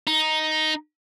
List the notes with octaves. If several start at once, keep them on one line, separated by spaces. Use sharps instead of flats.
D#4